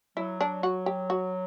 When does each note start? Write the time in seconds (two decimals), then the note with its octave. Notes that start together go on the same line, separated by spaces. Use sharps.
0.17 F#3 E4
0.41 D4
0.63 F#4
0.86 G4
1.10 F#4